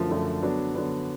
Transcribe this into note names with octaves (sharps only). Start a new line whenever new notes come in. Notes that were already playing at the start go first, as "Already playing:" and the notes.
Already playing: F#2 D3 F3 A3
F#2 D3 F3 A3
D3 F#3 B3 D4
D3 F#3 B3 D4